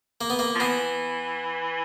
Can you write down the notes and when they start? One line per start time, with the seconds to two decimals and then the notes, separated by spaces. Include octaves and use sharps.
0.21 A#3
0.30 B3
0.39 A#3
0.55 F3
0.60 E3 B3